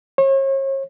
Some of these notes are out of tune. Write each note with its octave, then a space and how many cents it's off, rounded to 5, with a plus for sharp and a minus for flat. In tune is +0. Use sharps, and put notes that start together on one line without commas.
C#5 -40